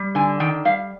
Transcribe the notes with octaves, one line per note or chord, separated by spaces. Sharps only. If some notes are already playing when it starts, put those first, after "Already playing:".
Already playing: G3
D3 G#5
D#3 G5
G3 F5